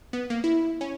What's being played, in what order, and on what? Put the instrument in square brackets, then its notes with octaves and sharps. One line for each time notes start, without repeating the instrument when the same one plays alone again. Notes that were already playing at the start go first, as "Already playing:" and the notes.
[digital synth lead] B3
A#3
E4
C#4